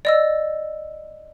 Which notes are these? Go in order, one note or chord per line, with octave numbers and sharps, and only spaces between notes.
D5 D#5 E6